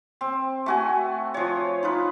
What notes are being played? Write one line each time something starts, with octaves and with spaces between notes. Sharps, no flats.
C4
A3 F#4 G#5
F3 C#5
D#4 F4 B4